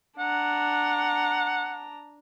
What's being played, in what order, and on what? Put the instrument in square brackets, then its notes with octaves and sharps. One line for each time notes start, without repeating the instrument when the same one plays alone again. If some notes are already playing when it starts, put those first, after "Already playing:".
[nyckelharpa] D4 A#5 [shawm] F#5